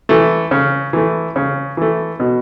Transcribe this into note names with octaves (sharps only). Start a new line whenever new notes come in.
E3 A3
C#3
E3 A3
C#3
E3 A3
B2